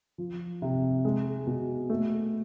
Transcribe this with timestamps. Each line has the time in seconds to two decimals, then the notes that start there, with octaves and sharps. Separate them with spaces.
0.18 F3
0.62 C3
1.05 G#3
1.47 B2
1.90 A3